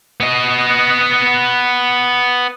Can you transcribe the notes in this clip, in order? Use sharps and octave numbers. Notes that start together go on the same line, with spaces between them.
B3 D#5